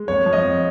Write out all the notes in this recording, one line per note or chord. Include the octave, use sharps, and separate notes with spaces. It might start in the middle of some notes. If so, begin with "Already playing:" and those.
Already playing: G#3
F2 C#5
F3
D#5
F2